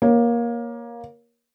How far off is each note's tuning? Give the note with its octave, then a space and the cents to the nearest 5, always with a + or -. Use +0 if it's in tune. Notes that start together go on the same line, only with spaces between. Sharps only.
A#3 +15 C#5 +0